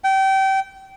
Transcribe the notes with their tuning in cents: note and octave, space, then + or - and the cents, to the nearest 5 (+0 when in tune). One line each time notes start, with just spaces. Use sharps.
G5 -30